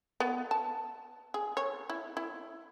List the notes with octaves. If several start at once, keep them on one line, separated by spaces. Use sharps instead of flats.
B3
A5
G#4
C#5
E4
E4